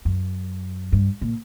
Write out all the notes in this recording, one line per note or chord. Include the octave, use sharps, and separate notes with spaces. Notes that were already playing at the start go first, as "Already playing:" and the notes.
F#2
G2
A#2